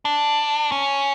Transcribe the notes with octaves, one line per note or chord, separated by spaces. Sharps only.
D4
C#4